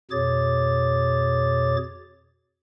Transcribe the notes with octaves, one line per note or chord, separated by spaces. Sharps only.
F2 B2 G#4 C#5 D6 A6